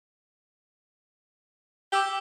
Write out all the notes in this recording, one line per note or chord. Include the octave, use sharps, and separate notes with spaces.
G4 D6 E6 G7